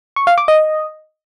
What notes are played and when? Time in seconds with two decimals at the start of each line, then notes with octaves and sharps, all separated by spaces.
0.16 C#6
0.27 F5
0.38 D6
0.48 D#5